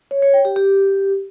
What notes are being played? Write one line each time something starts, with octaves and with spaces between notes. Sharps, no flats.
C#5
C#5
G5
G4
G4